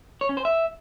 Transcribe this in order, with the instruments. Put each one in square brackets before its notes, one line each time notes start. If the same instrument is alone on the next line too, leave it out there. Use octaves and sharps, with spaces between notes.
[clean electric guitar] C#5
C#4
C5
E5